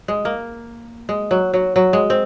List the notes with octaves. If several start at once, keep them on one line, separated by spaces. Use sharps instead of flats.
G#3
A#3
G#3
F#3
F#3
F#3
G#3
C4